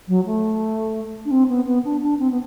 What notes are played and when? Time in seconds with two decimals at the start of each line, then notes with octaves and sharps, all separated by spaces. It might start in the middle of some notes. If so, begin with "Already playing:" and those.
0.08 F#3
0.26 A3
1.25 D4
1.31 C4
1.49 B3
1.66 B3
1.85 D4
2.02 D4
2.19 C4
2.31 B3